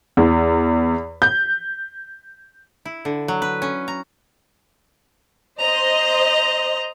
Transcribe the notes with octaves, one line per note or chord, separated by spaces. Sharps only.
E2
G6
E4
D3
F#3
B4
C#4
A#5
C5 D#5 A#5